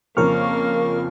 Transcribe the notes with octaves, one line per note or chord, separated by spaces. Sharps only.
F2 C#3 F3 A#3 A#4 C#6 F6